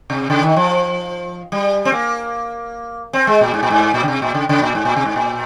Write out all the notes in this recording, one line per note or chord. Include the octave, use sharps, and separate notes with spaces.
C3
C#3
D#3
F3
G3
C4
A#3
C4
G#3
A#2
G#2
A#2
G#2
A#2
C#3
C3
A#2
C#3
C#3
A#2
G#2
A#2
C3
G#2
A#2